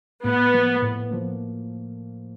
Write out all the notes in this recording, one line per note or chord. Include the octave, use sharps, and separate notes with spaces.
A2 B3
F3 A#3
A2
F3 A#3